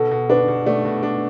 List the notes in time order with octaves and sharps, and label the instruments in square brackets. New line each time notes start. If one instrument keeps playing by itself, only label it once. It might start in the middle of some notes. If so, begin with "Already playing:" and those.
Already playing: [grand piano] B2 [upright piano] A4
[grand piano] B2
[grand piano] D4 [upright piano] B4
[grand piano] B2
[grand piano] A3 [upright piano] D5
[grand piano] B2
D4